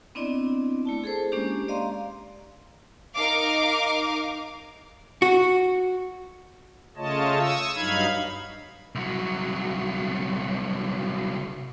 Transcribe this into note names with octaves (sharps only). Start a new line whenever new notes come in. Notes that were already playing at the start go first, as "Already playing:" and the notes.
B3 C4 D4 E4 D5 D#5
A3 E4 A5
G#4 A4 C5
G#3 A#3 C#4 D4 G4
D5 D#5 F5 A#5 C6
D#4 A#4 F5 D6
F#4
C#3 A3 F4 C#5 D#5 A5
C#6 D#6 E6
G2 F#3 D#4 F5 B5 G#6
C2 F#3